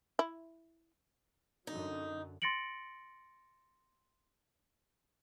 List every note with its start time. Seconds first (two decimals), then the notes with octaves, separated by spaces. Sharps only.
0.19 E4
1.67 F#2 D3 F#3 D#4
2.42 C6 A6 A#6 C#7 D7 F#7